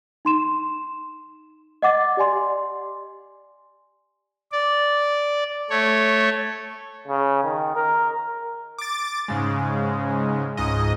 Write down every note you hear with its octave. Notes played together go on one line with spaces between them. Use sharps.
D#4 C6 E7
D#5 F#5 D6 A6
G4 D5 G#5 C6
D5
A3 C#5
C#3
D#3
A#4
D6 A6
G#2 C#3 G#3
C#2 G#2 D#5